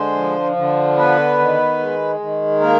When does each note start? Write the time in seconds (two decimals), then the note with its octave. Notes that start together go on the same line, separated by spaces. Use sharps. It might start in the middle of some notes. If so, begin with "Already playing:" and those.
Already playing: D3 G#3 C5
0.16 F3
0.56 D3
0.97 B3 B4
1.38 D#3
1.79 G#3
2.20 D#3
2.60 A#3 A#4